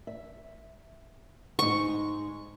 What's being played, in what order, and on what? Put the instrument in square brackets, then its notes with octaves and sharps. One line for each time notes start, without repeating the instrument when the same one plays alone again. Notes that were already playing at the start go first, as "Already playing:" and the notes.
[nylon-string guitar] E5
[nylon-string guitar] G#2 G#3 D#4 [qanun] C#6